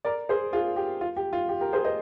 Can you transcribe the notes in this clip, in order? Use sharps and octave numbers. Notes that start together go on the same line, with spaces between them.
A#4 D5
G#4 C5
F4 G#4
G4
F4
G4
F4
G4
G4 A#4
G#4 C5
C5 D#5